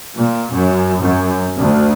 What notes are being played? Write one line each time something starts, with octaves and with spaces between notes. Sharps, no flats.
A#2
F#2
F#2
D2